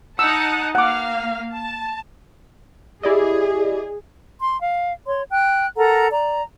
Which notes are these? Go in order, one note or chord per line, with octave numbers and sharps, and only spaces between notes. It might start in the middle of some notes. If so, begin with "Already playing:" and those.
D#4 F#5 A5 E6
A#3 F5 F#5 D6
A5
E4 G4 G#4 D5 D#5
C6
F5
C#5 C6
G5 F#6
A4 A#4 F#5 A#5
D5 A#5